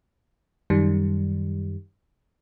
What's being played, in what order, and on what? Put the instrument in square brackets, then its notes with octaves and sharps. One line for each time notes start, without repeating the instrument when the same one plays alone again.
[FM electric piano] F#2 D#3 G3